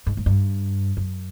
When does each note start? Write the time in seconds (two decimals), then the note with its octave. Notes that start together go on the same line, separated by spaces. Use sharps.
0.07 G#2
0.17 G#2
0.26 G2
0.97 F#2